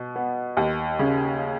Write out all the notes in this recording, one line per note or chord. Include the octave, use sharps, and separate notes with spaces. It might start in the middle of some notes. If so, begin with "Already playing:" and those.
Already playing: B2
B3
D#2
C#3